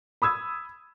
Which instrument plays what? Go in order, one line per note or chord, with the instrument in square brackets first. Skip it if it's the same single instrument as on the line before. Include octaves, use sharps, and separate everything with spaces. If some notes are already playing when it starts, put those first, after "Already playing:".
[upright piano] B5 D#6 E6 G#6